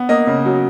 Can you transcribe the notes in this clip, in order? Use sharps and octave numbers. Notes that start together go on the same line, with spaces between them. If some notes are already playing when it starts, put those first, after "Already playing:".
Already playing: B3
A#3 D#5
C#3
F#3